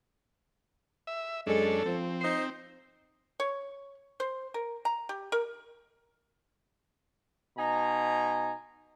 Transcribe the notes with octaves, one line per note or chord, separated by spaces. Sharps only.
E5
F#2 G#3 C#4 D4 A4
F3 C4
D#4 C5
C#5
C5
A#4
A#5
G4
A#4
B2 D#4 G#5 A#5